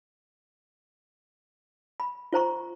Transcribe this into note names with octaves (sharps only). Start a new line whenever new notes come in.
B5
F4 C5 A#5 C#6